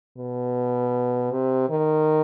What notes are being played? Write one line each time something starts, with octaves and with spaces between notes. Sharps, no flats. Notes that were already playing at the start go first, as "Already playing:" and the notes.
B2
C3
D#3